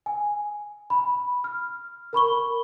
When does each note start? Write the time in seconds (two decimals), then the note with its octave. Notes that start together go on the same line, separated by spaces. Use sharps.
0.06 G#5
0.90 B5
1.44 F6
2.13 A#4 B5 C#6 G7